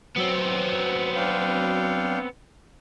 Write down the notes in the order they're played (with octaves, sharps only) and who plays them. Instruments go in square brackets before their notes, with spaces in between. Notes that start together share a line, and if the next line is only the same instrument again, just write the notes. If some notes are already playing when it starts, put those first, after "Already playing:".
[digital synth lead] F#3 [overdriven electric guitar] B3 C4
[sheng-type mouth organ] D4 F5 G5